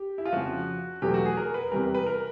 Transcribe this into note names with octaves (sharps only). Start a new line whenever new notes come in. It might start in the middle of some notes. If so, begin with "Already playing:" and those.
Already playing: G4
E4
F4
F2 C#3 F3 F#4
E2 B2 F#3 A3 G4
F#4
G#4
A#4
B4
E2 C3 E3 G3 A#4
B4
A#4